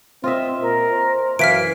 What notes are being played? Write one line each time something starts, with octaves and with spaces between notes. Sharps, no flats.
C4 F4 D#5 E5
A#2 A#4
C5
F#2 E3 F5 F6 B6 D7